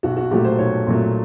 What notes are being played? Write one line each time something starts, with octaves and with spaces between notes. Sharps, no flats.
B1 F#4
F#4
A#2 F#3 A3 G4
C5
B1 C#5
A#2 F#3 A3